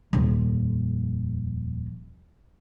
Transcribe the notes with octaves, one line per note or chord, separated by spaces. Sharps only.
D#1 F2